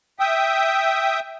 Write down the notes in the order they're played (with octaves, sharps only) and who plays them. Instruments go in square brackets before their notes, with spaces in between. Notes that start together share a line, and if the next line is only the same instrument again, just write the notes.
[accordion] E5 G5 D#6